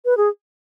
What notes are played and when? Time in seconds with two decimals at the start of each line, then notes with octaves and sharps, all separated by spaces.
0.05 B4
0.17 G#4